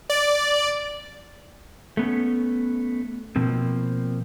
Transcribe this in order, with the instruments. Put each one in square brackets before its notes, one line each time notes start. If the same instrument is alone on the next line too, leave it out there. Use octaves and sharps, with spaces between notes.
[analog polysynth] D5
[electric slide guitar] A3 B3 C#4
B2 F3 A#3 C4